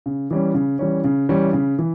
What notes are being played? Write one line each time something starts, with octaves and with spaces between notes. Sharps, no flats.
C#3
E3 G3 C#4
C#3
E3 G3 C#4
C#3
E3 G3 C#4
C#3
E3